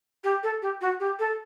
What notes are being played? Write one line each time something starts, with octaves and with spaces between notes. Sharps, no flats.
G4
A4
G4
F#4
G4
A4